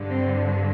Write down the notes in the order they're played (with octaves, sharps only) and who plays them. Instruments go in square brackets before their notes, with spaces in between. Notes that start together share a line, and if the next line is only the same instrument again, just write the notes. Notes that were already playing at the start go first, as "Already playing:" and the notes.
Already playing: [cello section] G2 D3
C4